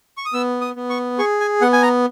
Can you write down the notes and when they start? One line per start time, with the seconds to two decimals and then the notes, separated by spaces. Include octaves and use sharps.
0.17 C#6
0.25 D#6
0.33 B3 E6
0.61 D#6
0.76 B3
0.90 C#6
1.19 G#4 C#6
1.40 G#5
1.61 B3 F#5
1.73 G#5
1.82 A#5